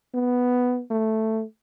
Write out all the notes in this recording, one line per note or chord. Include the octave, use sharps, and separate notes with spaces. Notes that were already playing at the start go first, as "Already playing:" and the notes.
B3
A3